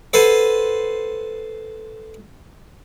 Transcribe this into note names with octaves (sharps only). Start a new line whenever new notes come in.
A4 B4 C5 F#5 G#5